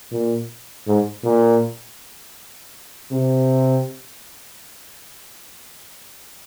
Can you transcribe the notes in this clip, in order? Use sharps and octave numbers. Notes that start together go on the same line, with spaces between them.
A#2
G#2
A#2
C3